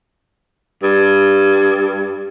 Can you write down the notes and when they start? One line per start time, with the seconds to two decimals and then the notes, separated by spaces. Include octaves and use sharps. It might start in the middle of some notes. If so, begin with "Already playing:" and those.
0.83 G2